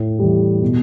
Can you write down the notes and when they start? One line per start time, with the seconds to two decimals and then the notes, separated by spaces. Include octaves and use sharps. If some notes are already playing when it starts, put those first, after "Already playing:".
Already playing: A2
0.19 E3 G3
0.61 B2